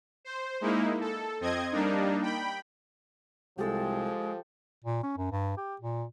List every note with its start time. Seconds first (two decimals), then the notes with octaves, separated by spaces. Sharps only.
0.25 C5
0.61 G#3 A#3 D#4 E4
1.01 A4
1.40 F2 C4 D#5 G#6
1.72 G3 A#3 D4 D#4
2.22 G5 B5
3.58 C2 F3 G#3 G4 A4 E6
4.85 A#2
5.03 C#4
5.17 F#2
5.31 G2
5.57 G4
5.81 A#2